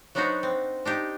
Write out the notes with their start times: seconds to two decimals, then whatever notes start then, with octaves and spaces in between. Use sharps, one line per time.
0.15 F#3 B3 D4 D#4 F#4 C5
0.43 C4
0.85 D4 D#4 G4